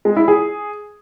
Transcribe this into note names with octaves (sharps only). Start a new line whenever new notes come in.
G#3
E4
G#4